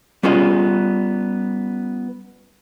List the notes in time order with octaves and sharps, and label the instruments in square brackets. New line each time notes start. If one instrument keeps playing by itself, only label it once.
[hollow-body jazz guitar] G3 B3 C#4 F4 G#4 D#5